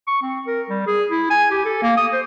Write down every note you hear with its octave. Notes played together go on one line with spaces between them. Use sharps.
C#6
C4
A#4
G3
G#4
E4
G#5
G4
A4
A#3
D#6
C5